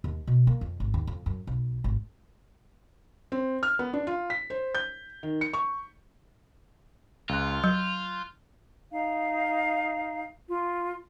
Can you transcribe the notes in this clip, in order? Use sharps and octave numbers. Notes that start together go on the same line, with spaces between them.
D#2
B2
A#3
F2
G#1
D#2
F2
F#2
B1
G#1
C4
F6
B3
D4
F4
B6
C5
G6
D#3
C#7
C#6
C#2 F4 F#6
F#3 G6
D#4 F5
F4